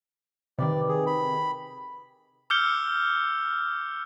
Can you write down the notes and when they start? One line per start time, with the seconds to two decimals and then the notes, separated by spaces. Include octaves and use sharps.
0.59 C3 D#3 B4 D5 G5
0.88 G#4
1.07 B5
2.50 D6 E6 F6 G6 C#7 G7